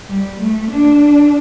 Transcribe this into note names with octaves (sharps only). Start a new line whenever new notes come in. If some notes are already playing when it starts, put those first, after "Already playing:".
G3
A3
D4